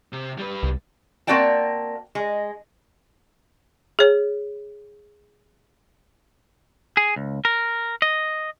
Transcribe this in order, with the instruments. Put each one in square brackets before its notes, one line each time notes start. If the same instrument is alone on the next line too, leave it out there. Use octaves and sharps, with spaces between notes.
[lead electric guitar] C3
G3 B4
[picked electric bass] C2
[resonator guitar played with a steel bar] A#3 C4 F#4 D5 G5 A5
G#3
[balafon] G#4 C#5
[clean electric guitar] G#4
C#2
A#4
D#5